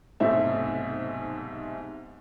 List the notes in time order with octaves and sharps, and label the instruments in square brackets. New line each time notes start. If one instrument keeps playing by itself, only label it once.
[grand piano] B1 G#2 C3 A3 C5 E5